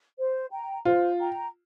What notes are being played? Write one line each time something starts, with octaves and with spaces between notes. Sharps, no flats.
C5
G5 A#5
F4 C5
G5 A#5